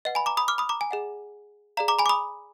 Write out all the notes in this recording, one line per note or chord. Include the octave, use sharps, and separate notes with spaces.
B4 D#5 F#5
G#5 B5
A#5 D6
B5 D#6
D6 F6
B5 D#6
A#5 D6
G#5
G#4 D#5 F#5
G#4 D5 F5 A#5
A#5 D6
G#5 B5
D6
B5 D#6